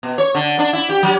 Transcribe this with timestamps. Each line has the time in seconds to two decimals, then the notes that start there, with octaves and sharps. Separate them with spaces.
0.03 B2
0.18 C#5
0.35 D3
0.59 D4
0.73 E4
0.89 G4
1.03 F#3